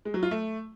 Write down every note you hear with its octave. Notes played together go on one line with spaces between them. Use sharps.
G#3
F#3
F4
A3